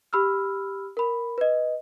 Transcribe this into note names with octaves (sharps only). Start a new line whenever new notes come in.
G4 B5 E6 F6
A#4 B5
B4 D#5